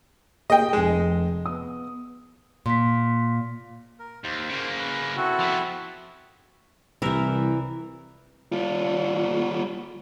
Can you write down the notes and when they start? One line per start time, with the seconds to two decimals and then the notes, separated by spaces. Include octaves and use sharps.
0.50 A#3 G4 G#4 D#5 G5
0.73 F1 G#3 E7
1.46 B3 D#6
2.66 A#2 C6 B6
3.99 A#4
4.24 D#2 C5
4.49 C#3 A#3
4.79 B4
5.17 C4 E4 F#4 A4
5.39 F3 B3
7.02 C2 E3 G3 A#4 E5
8.52 G3 F4